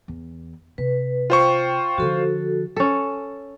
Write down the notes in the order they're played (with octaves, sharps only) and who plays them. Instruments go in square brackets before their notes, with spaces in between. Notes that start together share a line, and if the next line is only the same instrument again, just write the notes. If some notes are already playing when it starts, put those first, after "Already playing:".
[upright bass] E2
[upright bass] C3 [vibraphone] B4
[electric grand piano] F4 C5 C#6 [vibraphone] G5
[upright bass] D3 F3 [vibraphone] F#4 A4
[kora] C#4 A4